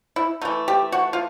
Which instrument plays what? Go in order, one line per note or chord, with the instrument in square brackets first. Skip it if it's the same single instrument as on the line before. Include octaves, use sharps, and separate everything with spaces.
[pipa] E4
E3 A3 D#4
G4
F#4
F4